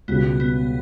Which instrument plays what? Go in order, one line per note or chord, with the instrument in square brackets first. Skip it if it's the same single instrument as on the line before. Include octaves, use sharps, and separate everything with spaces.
[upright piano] C#2 B2 G3 [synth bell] B3
[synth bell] B3